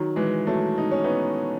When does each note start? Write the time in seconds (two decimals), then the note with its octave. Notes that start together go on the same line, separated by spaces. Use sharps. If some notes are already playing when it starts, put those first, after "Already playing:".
Already playing: D#3 F#3
0.16 E3 G#3
0.47 F#3 A3
0.78 D#4
0.91 C#4
1.04 B3 D#4